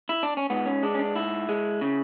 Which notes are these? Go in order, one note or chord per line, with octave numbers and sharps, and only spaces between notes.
E4
D4
C#4
G#2 B3
C#4
G#3 D4
C#4
D4
G#2 E4
G#3
C#3